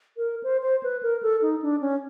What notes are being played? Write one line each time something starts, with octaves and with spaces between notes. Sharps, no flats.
A#4
C5
C5
B4
A#4
A4
D#4
D4
C#4